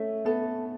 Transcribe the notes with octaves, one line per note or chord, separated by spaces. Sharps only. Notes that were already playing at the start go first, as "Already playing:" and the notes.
Already playing: A3 C#4 E5
B3 A4